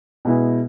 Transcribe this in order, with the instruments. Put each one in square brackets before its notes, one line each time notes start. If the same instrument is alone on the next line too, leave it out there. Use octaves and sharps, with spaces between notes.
[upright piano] B2 G#3 B3 E4 G#4